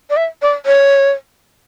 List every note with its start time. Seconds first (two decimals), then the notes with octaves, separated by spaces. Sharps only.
0.10 D5
0.17 E5
0.42 D5
0.66 C#5